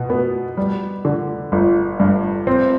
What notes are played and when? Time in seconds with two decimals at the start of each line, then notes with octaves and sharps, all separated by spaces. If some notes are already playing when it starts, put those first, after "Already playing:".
Already playing: B2
0.10 B3
0.57 G3
1.05 D3
1.52 G1
2.00 G2
2.47 C4